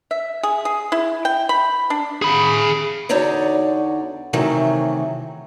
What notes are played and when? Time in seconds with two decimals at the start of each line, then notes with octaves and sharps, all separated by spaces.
0.11 E5
0.43 G#4
0.65 G#4
0.92 E4
1.25 G5
1.49 B5
1.90 D4
2.22 G#4 B5
3.09 E2 D3 D#4 F#4 C#5 D5
4.33 C3 D#3 E3 F#3 A3